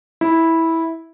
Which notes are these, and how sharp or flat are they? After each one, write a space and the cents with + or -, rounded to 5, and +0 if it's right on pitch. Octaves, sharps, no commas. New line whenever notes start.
E4 -10